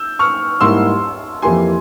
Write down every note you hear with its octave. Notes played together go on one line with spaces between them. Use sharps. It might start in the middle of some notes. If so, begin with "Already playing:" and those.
Already playing: E6 G6
C#6 F6
G#2 G3 A#3 E4 G4 C6 E6
F2 E3 A#3 E4 G4 G#5 C6